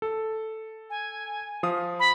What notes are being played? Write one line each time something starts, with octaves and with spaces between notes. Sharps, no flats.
A4
G#5
F3 F5 D#6
B5